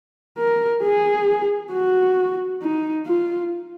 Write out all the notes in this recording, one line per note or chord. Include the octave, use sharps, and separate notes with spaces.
A#4
G#4
F#4
D#4
F4